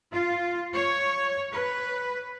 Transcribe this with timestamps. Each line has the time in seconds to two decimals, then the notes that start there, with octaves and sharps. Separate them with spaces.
0.11 F4
0.74 C#5
1.51 B4